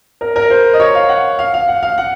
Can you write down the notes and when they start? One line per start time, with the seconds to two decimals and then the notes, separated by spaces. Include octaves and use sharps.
0.21 A#4
0.36 A#4
0.50 C5
0.74 D#5
0.80 C#5
0.95 F5
1.09 F#5
1.39 F5
1.54 F5
1.68 F#5
1.83 F5
1.98 F#5